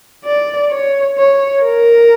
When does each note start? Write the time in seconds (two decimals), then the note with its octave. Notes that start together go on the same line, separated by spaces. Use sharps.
0.25 D5
0.71 C#5
1.18 C#5
1.64 A#4